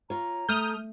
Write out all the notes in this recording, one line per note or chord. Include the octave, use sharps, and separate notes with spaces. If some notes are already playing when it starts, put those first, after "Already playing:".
F4 C#5 A#5
A3 D#6 F6 G6